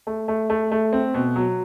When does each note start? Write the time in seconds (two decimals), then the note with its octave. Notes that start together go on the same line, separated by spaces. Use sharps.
0.07 A3
0.28 A3
0.50 A3
0.71 A3
0.93 C4
1.14 B2
1.36 F#3